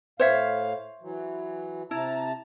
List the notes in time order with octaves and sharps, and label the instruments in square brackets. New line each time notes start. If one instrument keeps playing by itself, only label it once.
[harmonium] A2 F5 [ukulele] C5 C#5 E5
[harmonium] E3 F#3
[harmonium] C3 A5 A#5 [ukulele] E4